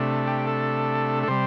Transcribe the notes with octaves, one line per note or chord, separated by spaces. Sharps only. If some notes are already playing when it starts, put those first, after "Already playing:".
Already playing: C3 A3 D4
G4
A4
A4
C3 G3 C5